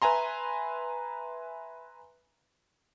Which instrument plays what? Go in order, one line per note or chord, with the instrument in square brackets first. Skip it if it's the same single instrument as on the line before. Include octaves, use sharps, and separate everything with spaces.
[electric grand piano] B4 E5 G#5 A#5 C6